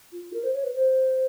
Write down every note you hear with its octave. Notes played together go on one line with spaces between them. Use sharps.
F4
A#4
C5
C#5
B4
C5